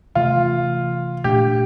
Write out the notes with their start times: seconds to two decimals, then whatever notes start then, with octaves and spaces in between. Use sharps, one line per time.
0.15 C3 E3 A3 F4
1.24 A#2 A3 D4 G4